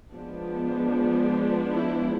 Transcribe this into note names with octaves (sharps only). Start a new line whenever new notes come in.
F3 G#3 B3 D4
E4